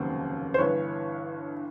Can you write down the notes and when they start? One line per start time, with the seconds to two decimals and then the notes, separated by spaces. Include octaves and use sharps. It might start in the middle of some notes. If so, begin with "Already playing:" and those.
Already playing: F1 D#2 C#3 F#3 A#3 C5
0.54 C5
0.58 G1 G2 E3 B4 C#5